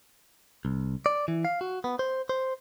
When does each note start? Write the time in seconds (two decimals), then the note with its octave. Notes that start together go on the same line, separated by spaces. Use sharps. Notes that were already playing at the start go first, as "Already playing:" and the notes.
0.65 C2
1.06 D5
1.28 E3
1.45 F5
1.61 F#4
1.84 B3
1.99 C5
2.29 C5